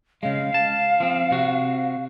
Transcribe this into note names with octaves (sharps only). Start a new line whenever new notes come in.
C#3 G#3 F5
A5
F3 C4
C3 F#4